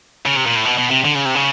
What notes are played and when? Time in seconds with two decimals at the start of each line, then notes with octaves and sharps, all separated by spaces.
0.26 C#3
0.36 C3
0.46 A#2
0.55 A2
0.65 B2
0.78 B2
0.91 C3
1.05 D3
1.15 C#3
1.25 C3
1.35 C#3